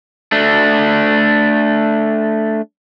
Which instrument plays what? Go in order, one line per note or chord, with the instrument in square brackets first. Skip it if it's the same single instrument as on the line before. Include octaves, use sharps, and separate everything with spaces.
[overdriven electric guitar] A3 D4